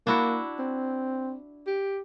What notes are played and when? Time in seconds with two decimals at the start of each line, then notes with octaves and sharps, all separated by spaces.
0.07 A#3 D4 E4 F#4
0.59 C4
1.67 G4